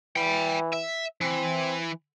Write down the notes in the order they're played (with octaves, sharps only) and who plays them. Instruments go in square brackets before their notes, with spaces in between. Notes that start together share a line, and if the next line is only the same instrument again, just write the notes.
[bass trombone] E3 [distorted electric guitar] G5 B5
[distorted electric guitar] E5
[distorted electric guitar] E3 [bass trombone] C4